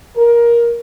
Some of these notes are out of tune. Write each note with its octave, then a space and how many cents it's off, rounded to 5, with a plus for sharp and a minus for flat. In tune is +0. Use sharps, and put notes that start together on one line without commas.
A#4 +15